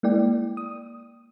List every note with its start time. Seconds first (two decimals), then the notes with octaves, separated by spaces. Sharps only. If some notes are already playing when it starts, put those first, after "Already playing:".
0.03 G#3 A#3 E4 D5 G5
0.57 D#6